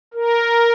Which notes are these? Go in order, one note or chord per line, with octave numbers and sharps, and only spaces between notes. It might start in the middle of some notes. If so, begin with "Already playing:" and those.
A#4